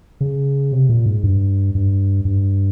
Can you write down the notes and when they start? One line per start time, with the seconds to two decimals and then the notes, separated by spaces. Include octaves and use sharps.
0.21 C#3
0.72 C3
0.89 A#2
1.06 G#2
1.24 G2
1.75 G2
2.25 G2